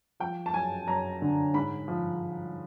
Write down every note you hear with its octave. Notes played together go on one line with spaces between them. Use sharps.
F3 G5
A5
F#2 G#5
F#2 A#5
D3
G#2 B5
F3